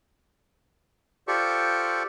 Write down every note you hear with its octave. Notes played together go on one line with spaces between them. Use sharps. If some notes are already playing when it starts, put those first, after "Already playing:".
F4 G4 A4 C5 D5 C#6